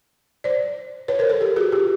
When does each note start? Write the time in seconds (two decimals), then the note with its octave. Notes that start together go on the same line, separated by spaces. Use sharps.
0.44 C5 D5
1.08 B4 C#5
1.19 A#4 C5
1.29 A4 B4
1.40 G4 A4
1.56 F#4 G#4
1.72 F4 G4